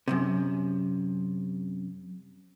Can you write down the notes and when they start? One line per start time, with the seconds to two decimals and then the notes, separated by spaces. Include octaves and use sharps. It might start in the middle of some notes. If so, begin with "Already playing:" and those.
0.08 F#2 A2 C3